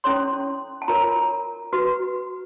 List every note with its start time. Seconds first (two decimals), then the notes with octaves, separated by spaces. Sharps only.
0.04 C#4 E4 A4 C#5 C6
0.82 A5
0.88 F4 A#4 C#5 A#5
1.73 F#4 B4